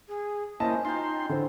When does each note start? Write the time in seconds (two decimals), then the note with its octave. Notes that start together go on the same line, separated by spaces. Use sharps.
0.08 G#4
0.60 A#3 C#4 E4 C5 D#5 A5
0.85 D#4 F4 G5 A#5 C6
1.29 D3 E4 C5 A#5